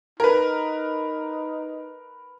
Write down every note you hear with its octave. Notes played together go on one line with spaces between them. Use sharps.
D#4 A#4 B4